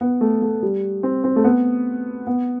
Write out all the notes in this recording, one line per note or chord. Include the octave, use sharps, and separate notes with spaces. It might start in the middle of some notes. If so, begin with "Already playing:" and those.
B3
A3
A3
G3
C4
C4
A3
B3
B3